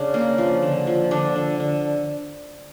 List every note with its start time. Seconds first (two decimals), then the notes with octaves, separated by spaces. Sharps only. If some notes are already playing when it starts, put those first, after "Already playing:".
Already playing: C#3 D4
0.14 A#3
0.38 F3
0.62 D3
0.87 F3
1.11 D3 D4
1.36 D3
1.60 D3